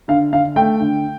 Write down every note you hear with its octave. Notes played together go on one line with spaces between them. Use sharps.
D3 F5
D3 F5
A3 G5
D3